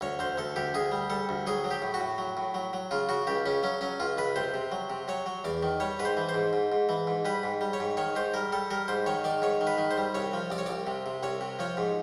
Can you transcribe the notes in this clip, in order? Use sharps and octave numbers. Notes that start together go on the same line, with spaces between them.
D2 C#5
D2 C5
D2 A4
D2 G4
D2 G#4
G3
G3 A4
D2
F#3 G#4
F#3
G4
A2
F#4
A2
F#3
A2
F#3
F#3
C#3 F4
C#3 F#4
C#2 G4
C#3 C#4
F#3 C#4
F#3 C#4
C#2 F4
C#2 B4
C3 C5
C3
F#3
C3
F#3 C#5
F#3
E2 D5
D#3
G3 C#5
G#2 B4
C5
E3
C5
G#2
G#2
G#2
E3
G#2
G3 B4
G#2
G3
C#5
G#2
D#3 C#5
G#2 C5
G3 A#4
G3 A4
G3 A#4
G#2 C5
D#3 C#5
D#3 D5
G#2 C#5
D#3
B4
D#3
C5
G3
C2 C#5
F3
C2 D5
C#5
C2 D5
C3
C3
C2 C#5
C3
F3 C#5
G#2